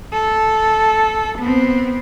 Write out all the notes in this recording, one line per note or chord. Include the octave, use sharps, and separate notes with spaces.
A4
B3 C4